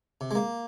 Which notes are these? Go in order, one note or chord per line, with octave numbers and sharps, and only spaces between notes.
C3
G#3
A#3